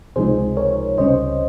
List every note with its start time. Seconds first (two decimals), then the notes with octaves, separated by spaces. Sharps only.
0.16 C#2 C3 F3 G#3 D#4 G#4 C5
0.57 A#4 C#5
0.98 C#2 C3 G3 C#4 C5 D#5